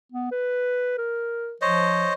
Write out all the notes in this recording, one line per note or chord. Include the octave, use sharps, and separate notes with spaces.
B3
B4
A#4
F3 C5 C#5 D#5